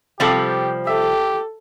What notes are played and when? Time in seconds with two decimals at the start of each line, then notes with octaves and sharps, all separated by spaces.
0.20 C3 F3 G3 C4 G4 A4 D6
0.87 G4 A4 E5